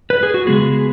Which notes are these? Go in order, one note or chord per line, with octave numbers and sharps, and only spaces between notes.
B4
G#4
F#4
C#3 G#3 B3 G#4